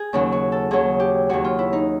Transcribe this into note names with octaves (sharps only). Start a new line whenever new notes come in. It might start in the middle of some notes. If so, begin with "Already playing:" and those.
Already playing: G#4
D#2 C#3 F#3
F#4
A4
D#2 C#3 F#3 G#4
G4
D#2 C#3 F#3 F#4
F4
E4
D#4